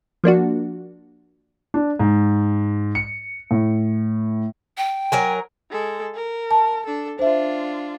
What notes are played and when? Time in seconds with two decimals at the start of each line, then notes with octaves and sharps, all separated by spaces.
0.24 F3 A#3 D4 F#4
1.74 D4
1.99 G#2
2.95 C#7
3.51 A2
4.78 G5
5.12 F#3 A#4 G#5
5.70 G#3 A4
6.15 A#4
6.51 A5
6.86 D4 A4
7.19 D4 F4 C5 E5